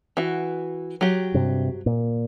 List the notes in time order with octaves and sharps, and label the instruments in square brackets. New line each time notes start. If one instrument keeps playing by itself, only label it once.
[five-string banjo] E3 F#4
F#3 G4
[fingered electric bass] G2 C3
A#2